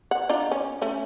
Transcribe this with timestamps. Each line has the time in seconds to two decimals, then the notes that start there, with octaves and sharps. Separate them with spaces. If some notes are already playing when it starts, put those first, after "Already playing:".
0.11 F#5
0.29 D4 D#4 F4
0.51 C#4
0.82 A3 C#4